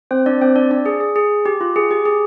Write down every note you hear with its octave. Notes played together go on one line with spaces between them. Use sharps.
C4 C5
D4 D5
C4 C5
D4 D5
D4 D5
G#4
G#4
G#4
G4
F4
G#4
G4
G#4